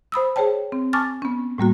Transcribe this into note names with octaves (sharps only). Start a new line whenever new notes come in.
C5 B5 D#6 E6
G#4 C5 C#5 G5 A5
C4
G#5 A5 C#6 D6 F6 A6
B3 C#4
A2 G3 A#3 F#4